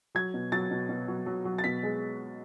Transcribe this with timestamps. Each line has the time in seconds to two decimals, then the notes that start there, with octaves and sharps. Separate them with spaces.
0.15 F#3 G#6
0.34 B2
0.52 F#3 A6
0.71 B2
0.89 B2
1.08 F#3
1.26 F#3
1.45 F#3
1.58 A6
1.64 B2 B6
1.83 G#3